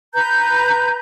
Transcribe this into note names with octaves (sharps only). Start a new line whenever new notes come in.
B4 A#5 G6